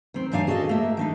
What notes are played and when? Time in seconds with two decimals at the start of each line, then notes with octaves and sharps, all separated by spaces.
0.14 D#3 C4
0.32 F#2 D#3 D4 F5 G#5
0.47 F#4 G#4 A4 C5 D#5 F5
0.69 A3 A#3 E5
0.97 D#3 D4 D#4